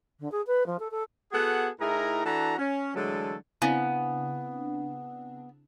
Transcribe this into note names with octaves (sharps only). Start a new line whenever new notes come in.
D3
G#4
B4
F3
A4
A4
B3 F#4 G#4 A4 F#5
A2 D#4 E4 G#4 A#4 A#5
E3 D4 F#4 A4 A5 A#5
C#4
D3 E3 F#3 G#3 A3 A4
C#3 B3 C4 D4 E4 F5 G#5